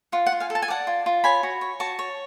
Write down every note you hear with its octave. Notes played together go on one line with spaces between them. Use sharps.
F4 F#5
F#5
F4
F5 G#5
A4
A5
G#5
D5 F#5 A5
F4
F4
C#5 G#5 B5
F#4
C#5
F#4 A5 C#6
C#5